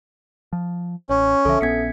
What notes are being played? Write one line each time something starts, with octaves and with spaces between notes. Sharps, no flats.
F3
A1 C#4 C#5
B1 D3 F3 A4 E5
A#1 B3 C#4 G#6 B6 C#7